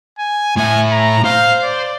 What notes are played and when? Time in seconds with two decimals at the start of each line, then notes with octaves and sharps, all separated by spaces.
0.19 G#5
0.56 A2 E4 G#5
0.92 A#5
1.24 C5 F5
1.63 D5